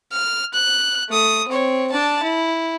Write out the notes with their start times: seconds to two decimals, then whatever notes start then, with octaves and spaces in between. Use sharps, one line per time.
0.12 F6
0.54 F#6
1.09 A3 D#6
1.48 C4 C#5
1.92 D4 A5
2.23 E4